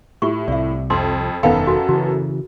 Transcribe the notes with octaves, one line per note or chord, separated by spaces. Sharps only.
A2 F4 G4 C#6
C2 C3 D5 E5
F2 C6
E1 F#2 D#3 B3 A4 F5 G5 B5
F#4 G#5
C#3 E3 F#4